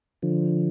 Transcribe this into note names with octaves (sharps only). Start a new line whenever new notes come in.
D3 F3